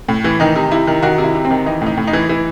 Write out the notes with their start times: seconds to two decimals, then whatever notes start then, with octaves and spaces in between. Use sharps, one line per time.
0.09 A2
0.24 E3
0.40 D#3 D#4
0.55 C3
0.71 C3 E4
0.87 D#3
1.02 D#3 F#4
1.18 C3
1.24 E4
1.35 C3
1.45 C4
1.51 D#3
1.66 E3 D#4
1.82 A2 D#4
1.97 A2
2.07 D#4
2.13 E3
2.29 E3